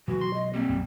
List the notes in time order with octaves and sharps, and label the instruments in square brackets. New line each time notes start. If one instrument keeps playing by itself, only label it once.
[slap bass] B2 F#3 G#3 [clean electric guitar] E3 [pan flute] F#4
[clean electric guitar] C6
[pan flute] D#5
[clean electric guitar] G3 A#3 [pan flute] C4
[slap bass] B1 F#2 B2